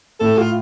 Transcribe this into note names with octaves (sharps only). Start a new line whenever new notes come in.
A2 A4
F4